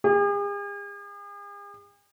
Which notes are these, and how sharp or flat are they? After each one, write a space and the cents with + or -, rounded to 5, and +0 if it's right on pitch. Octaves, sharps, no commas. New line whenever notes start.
G#4 -45